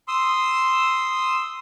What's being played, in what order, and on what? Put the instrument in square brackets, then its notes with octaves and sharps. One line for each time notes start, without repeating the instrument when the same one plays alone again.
[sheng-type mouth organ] C6 D#6 E6